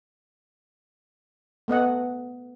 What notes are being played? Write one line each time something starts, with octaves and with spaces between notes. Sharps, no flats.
A3 B3 D#5 F#5